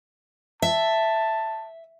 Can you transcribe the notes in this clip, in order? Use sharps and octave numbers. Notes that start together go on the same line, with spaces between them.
E5 A5